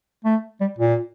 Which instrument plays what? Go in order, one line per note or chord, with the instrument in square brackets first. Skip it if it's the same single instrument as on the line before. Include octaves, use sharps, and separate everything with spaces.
[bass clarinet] A3
G3
A#2